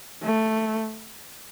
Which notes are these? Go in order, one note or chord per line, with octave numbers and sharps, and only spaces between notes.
A3